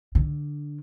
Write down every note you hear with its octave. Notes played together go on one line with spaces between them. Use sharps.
D3